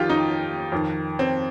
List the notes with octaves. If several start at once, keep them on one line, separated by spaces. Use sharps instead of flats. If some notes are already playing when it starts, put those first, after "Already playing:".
Already playing: F2 D#3 F4 G4
D#4
F2 D#3
C4